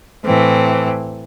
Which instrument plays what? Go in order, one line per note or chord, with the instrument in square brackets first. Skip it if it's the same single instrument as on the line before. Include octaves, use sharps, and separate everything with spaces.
[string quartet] A2 E3 C4